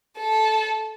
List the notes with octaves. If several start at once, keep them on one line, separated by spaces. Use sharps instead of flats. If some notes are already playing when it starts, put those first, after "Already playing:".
A4